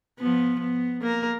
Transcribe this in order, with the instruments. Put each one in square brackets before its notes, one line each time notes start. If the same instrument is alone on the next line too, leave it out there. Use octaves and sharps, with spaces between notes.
[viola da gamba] F3 B3
B3
A#3 A#4